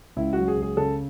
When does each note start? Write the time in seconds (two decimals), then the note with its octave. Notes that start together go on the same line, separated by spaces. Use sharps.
0.16 C#2 E4
0.33 F#3 F#4
0.48 G#4
0.57 C#2
0.62 G#4
0.77 C#3 A4